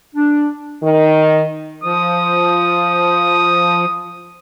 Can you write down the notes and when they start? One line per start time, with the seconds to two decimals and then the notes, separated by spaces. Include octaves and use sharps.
0.15 D4
0.83 D#3
1.84 F3 D#6